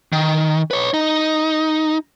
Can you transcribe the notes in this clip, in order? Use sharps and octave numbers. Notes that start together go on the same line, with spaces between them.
D#3
B4 C#5
D#4